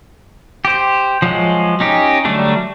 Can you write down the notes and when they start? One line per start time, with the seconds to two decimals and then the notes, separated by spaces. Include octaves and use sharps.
0.65 G4 C5
1.22 F3 F#3 G#3
1.80 C#4 D#4 G4
2.25 D3 F#3 G3 A3 D4